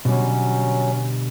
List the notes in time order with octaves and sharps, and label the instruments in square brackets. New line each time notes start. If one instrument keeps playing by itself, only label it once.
[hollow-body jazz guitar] B2 D3 G3 [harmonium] F#3 C#4